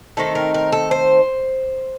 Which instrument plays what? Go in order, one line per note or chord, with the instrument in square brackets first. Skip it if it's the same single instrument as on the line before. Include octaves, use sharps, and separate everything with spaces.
[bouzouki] D#3 A3 C4 D#4 A4
A#4
A#4
A4
C5